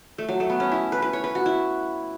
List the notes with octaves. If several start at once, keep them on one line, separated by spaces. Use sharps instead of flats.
A3
F#3
A3
B3
C#4
E4
B4
B4
C#5
B4
F#4
E4